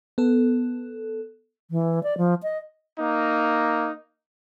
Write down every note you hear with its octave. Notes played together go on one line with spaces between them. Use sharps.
B3 A4
E3
D5
F3
D#5
A#3 D#4